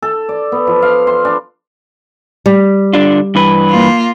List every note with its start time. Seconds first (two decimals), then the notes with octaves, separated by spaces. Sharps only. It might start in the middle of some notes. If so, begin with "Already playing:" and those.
0.02 A4
0.29 D5
0.52 B3
0.67 F3
0.82 F5
1.07 C6
1.25 D4
2.46 G3
2.93 D3 D4 F4
3.35 G2 E3 B4
3.70 A#3 F4